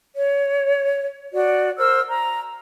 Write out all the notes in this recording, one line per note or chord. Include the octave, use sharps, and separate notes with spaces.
C#5
F#4 D5
A#4 C5 E6 F6
A#5